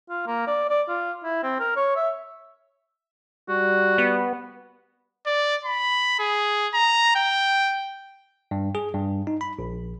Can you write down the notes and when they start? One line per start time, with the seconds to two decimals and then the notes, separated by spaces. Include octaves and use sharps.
0.10 F4
0.27 A#3
0.48 D5
0.70 D5
0.88 F4
1.24 E4
1.43 C4
1.60 A#4
1.76 C#5
1.96 E5
3.49 G3 F#4
3.98 B3
5.26 D5
5.65 B5
6.19 G#4
6.74 A#5
7.15 G5
8.51 G2
8.75 G#4
8.94 G2
9.27 D#4
9.41 B5
9.59 A#1